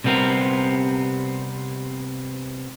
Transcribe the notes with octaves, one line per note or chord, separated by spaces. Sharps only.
C3 G3 B3 C4 A#4